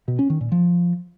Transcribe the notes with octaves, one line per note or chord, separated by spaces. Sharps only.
B2
C#4
D#3
A#2
F3